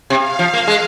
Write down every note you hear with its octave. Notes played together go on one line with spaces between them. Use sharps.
C3 F5
F3
A#3
G#3